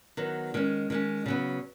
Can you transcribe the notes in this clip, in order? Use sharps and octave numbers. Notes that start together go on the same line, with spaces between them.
D#3 F#3 B3
D#3 G#3 C#4
D#3 G#3 C#4
C#3 F#3 B3